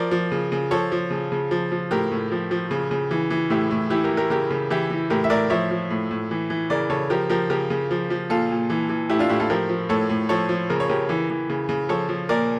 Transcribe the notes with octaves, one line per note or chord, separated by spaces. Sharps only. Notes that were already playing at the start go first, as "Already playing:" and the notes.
Already playing: F3 A#4 D5
F3
C#3
C#3
F3 A4 C#5
F3
C#3
C#3
F3
F3
A2 G4 A#4
A2
F3
F3
C#3
C#3
E3
E3
A2 E4 G4
A2
E3 E4 G4
G4 A#4
E3
G4 A#4
C#3 G4 A#4
C#3
E3 E4 G4
E3
A2 G4 A#4
E5
A2 A#4 D5
F3 C#5 E5
F3
A2
A2
E3
E3
C#3 A#4 D5
C#3 A4 C#5
F3 G4 A#4
F3 G4 A#4
C#3 G4 A#4
C#3
F3
F3
A#2 F4 A4
A#2
E3
E3
A2 E4 G4
D4 F4
A2 E4 G4
F4 A4
F3 G4 A#4
F3
A2 A4 C#5
A2
F3 A4 C#5
F3
C#3 A#4
C#5
C#3 G4 A#4
E3
E3
C#3
C#3
F3 A4 C#5
F3
A#2 A#4 D5